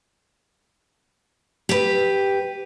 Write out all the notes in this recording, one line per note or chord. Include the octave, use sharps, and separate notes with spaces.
G4 B4